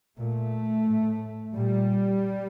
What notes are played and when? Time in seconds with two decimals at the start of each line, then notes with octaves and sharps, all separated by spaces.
0.17 A#2 A3
0.86 A2
1.56 A#2 G3